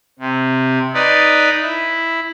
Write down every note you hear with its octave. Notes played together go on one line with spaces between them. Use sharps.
C3
D#4 B4 D5
E4